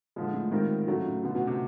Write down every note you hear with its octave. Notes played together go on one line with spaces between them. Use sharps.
A#2 D3 F3 G#3
A2
G#2 D#3 G3 C4 F4 A#4
A2 C#3 F#3 A3
A2
B2 D3 F#3 B3
B2
C3